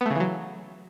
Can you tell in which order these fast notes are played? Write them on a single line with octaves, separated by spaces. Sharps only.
B3 A3 C#3 E3 F#3